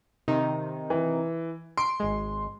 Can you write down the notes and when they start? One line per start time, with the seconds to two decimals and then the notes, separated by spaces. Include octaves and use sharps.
0.28 C3 D#3 D#4
0.90 E3
1.77 C6 C7 D7
2.00 G#1 G#3